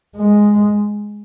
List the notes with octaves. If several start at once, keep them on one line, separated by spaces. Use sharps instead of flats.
G#3